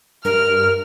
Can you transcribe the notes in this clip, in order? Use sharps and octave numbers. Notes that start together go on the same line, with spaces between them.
G2 A#4 F6